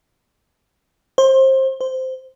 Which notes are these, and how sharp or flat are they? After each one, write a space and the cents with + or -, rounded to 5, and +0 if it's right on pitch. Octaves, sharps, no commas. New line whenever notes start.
C5 +25
C5 -10